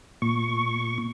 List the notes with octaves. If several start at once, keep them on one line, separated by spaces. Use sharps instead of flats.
A#2 C#6